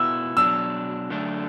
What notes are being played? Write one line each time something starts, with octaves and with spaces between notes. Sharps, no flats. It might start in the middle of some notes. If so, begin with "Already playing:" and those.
Already playing: B2 B3 E4 E6
B2 F#3 D4 E6
F#2 D3 A3 D4